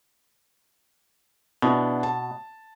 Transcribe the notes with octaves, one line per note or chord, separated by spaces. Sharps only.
B2 B3 D4 E4
A5